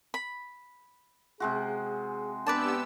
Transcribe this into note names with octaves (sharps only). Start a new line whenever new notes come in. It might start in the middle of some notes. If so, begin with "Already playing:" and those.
B5
C3 G#3 F#4 G#4
B3 D4 G4 B4 D5 A5 E6